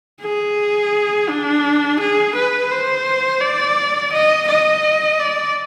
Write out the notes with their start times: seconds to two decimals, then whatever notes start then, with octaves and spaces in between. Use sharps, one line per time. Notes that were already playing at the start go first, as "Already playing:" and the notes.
0.22 G#4
1.29 D4
2.00 G#4
2.35 B4
2.71 C5
3.41 D5
4.13 D#5
4.48 D#5
5.19 D5